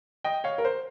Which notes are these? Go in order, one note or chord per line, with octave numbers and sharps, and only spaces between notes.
D#5 G5
C#5 F5
A#4
C5